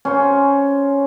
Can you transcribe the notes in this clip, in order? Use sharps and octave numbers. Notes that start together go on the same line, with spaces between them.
C#4 C5